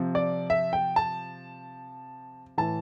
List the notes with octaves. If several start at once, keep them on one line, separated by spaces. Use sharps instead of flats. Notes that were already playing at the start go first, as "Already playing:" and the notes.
Already playing: C3 F3
D5
E5
G5
A5
A2 E3 A5